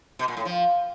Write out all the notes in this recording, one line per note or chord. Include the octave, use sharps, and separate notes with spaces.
B2
A#2
A2
F3